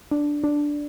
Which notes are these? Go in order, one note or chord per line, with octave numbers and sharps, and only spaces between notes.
D4
D4